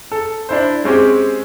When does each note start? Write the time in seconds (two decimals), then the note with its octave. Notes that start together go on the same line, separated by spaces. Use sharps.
0.12 A4
0.49 D4 E4 C5
0.84 G#3 C4 C#4 G4